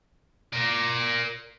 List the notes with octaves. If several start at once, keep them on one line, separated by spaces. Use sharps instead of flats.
A#4 D5